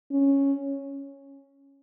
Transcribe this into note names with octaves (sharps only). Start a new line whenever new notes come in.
C#4